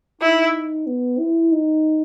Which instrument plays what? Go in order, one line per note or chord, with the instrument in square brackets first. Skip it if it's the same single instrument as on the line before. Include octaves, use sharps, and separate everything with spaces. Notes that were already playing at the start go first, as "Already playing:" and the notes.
[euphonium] D#4 [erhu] E4
[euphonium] B3
E4
D#4